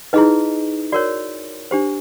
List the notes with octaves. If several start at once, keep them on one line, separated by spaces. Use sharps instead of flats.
D#4 E4 G#4 B4 D#5
F#4 A#4 C#5 D5
D4 G4 C5